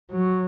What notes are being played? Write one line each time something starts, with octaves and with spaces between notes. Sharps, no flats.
F#3